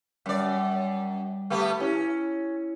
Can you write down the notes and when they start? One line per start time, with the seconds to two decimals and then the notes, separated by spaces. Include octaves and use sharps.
0.26 F#2 G3 D5
1.50 A3 B3 G4
1.80 C#4 E4